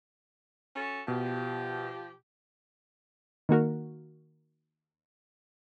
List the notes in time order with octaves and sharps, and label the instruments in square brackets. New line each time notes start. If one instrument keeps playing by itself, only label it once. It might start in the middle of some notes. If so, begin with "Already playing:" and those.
[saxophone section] C#4 F#4 A4
[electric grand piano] B2 [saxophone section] F3 G4
[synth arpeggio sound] D#3 A#3 F#4 A#4